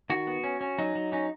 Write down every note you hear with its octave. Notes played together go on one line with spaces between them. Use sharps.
D#3 F#4
B3
C#4
C#4
F#3 D#4
F#3
C#4 D#4